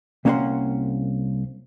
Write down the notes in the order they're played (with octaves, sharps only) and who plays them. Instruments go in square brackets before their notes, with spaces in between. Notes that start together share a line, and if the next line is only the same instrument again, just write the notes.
[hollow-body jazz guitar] C2 A#3 C#4 C5 F#5 C6